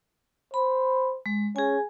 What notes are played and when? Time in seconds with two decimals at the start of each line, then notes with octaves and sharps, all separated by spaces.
0.54 C5 B5
1.26 G#3
1.56 C#4 G#4 G#5